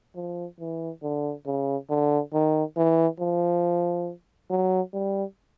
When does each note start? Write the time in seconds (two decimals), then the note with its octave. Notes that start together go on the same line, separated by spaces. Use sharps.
0.15 F3
0.60 E3
1.03 D3
1.46 C#3
1.89 D3
2.33 D#3
2.77 E3
3.20 F3
4.50 F#3
4.93 G3